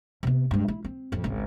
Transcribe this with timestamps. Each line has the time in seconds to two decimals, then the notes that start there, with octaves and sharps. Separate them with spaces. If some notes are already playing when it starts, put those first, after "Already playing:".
0.23 C3 B3
0.51 G2 G#3
0.68 E4
0.84 C4
1.12 A1 F2
1.24 G#1 C#2